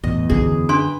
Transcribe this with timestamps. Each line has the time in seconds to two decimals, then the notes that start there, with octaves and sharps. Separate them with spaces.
0.04 E2 A2 D#5
0.30 F#2 D3 G#4
0.69 D4 B4 G5 C6